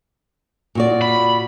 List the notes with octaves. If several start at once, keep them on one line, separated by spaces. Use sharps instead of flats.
A#2 F#4 D5
B5